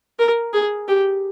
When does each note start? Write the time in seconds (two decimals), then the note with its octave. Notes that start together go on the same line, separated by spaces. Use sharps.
0.19 A#4
0.53 G#4
0.88 G4